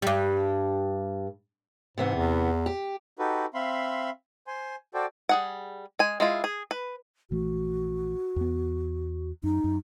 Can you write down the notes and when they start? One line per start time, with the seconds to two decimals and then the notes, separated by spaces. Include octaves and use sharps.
0.02 G2 G3
1.98 G#2 C3 E3 B3
2.15 E2
2.66 G4
3.19 D#4 F#4 G4 A4 B4
3.54 C4 E5 F5 B5 C6
4.47 C5 G#5 C6
4.94 F#4 A4 C5 D5 G5
5.29 G3 G#4 F#5
5.99 G#3 G#5
6.20 G#3 E4 F4
6.44 G#4
6.71 B4
7.31 A#1 E3 A3 F#4
8.36 E2 B3
9.43 F#2 D#4
9.64 F#2